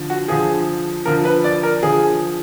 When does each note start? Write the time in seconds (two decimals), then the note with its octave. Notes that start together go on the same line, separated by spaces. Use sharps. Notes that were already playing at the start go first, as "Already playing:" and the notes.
Already playing: D3 F3
0.10 F#4
0.28 D3 F3 G#4
1.05 D3 F3 A#4
1.25 B4
1.44 D5
1.63 A#4
1.83 D3 F3 G#4